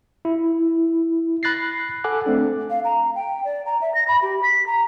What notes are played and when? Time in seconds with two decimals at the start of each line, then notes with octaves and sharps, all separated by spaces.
0.25 E4
1.43 B5 F#6 A6 A#6 C7
2.04 A4 F#5 G#5 D6 F#6
2.25 A3 C4 D4 A4
2.70 F5
2.84 A#5
3.15 G5
3.44 D5
3.66 A#5
3.81 E5
3.94 A#6
4.08 B5
4.22 G4
4.43 B6
4.67 A#5